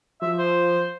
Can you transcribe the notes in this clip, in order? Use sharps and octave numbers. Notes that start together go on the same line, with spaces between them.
F3 E5
C5